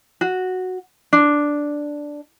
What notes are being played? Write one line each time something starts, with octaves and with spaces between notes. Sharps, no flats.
F#4
D4